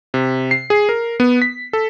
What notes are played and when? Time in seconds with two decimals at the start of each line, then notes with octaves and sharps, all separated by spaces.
0.14 C3
0.51 C7
0.70 G#4
0.89 A#4
1.20 B3
1.42 B6
1.73 A4